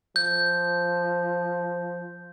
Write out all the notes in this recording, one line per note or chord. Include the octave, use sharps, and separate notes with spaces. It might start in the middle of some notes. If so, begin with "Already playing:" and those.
F3 G6